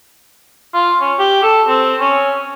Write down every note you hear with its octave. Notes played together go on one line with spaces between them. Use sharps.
F4
C#4
G4
A4
C4
C#4